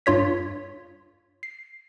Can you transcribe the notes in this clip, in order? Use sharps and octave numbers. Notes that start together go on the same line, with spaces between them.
G2 F4 C#5 B6
C7